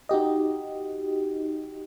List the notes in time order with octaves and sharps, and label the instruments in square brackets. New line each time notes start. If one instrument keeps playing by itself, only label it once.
[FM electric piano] D#4 F#4 G4 D#5